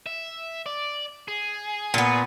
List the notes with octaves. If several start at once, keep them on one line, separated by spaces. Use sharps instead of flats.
E5
D5
G#4
A#2 B3